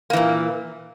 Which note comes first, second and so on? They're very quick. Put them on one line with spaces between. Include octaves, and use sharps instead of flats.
A#3 E3 A#2